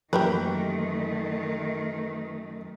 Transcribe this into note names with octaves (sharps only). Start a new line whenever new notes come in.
F#2 D#3 E3 A3 A#3 G4 A#4 B4